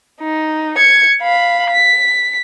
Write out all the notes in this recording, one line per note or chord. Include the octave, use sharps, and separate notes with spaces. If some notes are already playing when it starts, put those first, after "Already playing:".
D#4
G#6 C#7
F5 B5
B6